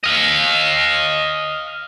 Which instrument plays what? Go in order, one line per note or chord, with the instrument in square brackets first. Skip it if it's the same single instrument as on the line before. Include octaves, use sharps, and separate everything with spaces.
[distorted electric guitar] D#5 F5